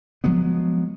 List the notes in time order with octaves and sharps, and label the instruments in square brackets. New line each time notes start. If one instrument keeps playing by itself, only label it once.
[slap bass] F3 F#3 G#3 B3